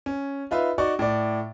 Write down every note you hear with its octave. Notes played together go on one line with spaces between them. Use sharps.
C#4
D#4 F4 B4 E5
D#4 F#4 D5 C#6
A2 D5